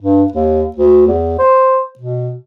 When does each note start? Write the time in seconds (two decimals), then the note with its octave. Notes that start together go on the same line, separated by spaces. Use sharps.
0.01 G2
0.32 D#2
0.76 D2
1.07 E2
1.39 C5
1.99 B2